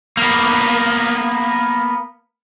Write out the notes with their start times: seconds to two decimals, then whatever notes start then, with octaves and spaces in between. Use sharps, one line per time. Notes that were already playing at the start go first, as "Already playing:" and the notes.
0.17 A#3 B3